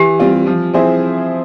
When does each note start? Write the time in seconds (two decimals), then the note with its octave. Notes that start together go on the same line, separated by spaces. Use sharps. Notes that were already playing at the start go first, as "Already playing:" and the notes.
Already playing: E3 G4
0.20 G3 C4 F4
0.47 F3
0.74 C4 E4 G#4 C5